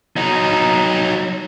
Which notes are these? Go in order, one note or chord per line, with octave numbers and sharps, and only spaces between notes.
F#3 D#4